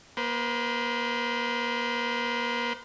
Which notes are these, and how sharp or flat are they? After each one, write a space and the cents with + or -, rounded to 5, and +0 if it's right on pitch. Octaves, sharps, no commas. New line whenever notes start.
A#3 +35 C5 -35